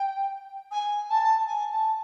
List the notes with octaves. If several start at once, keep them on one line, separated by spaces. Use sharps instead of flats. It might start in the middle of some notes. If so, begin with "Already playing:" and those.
Already playing: G5
G#5
A5
G#5
A5